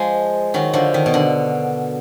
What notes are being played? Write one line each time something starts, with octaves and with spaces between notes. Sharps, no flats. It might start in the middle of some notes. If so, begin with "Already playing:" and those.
Already playing: F3 G#3
D#3 F#3
D3 F3
D#3
B2
D3